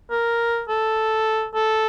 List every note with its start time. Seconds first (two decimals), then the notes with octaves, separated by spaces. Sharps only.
0.11 A#4
0.69 A4
1.55 A4